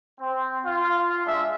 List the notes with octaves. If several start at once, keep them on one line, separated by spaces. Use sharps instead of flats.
C4
F4
G#3 D4 E5